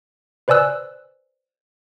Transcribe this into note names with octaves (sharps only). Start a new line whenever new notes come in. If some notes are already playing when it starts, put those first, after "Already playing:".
B4 C5 D5 G#5 E6 F#6